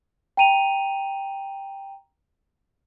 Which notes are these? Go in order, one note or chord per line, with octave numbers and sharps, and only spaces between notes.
G5 A#5 D#7 F7